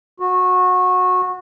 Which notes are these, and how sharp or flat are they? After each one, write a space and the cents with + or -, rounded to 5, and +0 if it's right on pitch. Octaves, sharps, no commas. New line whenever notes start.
F#4 -20